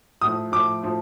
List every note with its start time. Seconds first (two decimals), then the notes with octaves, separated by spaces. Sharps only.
0.21 A2 F3 D#6
0.52 A2 F3 D6
0.83 A2 F3